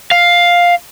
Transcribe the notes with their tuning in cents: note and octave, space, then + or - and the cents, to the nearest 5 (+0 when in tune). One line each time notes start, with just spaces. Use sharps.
F5 +5